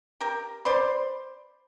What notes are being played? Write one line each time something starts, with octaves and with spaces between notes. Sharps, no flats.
G4 A#4
C5 D5 B5 C6